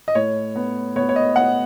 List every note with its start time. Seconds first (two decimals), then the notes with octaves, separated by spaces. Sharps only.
0.08 D#5
0.15 A2 C#5
0.56 B3
0.96 B3 C#5
1.09 C#5
1.16 D#5
1.36 B3 F#5